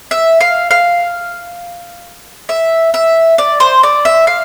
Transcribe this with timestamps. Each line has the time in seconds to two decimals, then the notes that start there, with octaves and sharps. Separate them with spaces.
0.11 E5
0.41 F5
0.71 F5
2.49 E5
2.94 E5
3.38 D5
3.60 C5
3.83 D5
4.05 E5
4.27 F5